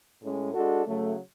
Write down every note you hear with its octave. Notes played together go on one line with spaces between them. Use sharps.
A2 G#3 C#4
G#3 D4 F#4 A4
C#3 F#3 A3